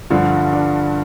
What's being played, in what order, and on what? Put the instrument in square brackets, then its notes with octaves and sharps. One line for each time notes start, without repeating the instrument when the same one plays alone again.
[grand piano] G2 [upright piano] D3 F3
[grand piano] D4